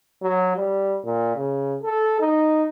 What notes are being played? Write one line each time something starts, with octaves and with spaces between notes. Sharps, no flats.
F#3
G3
A#2
C#3
A4
D#4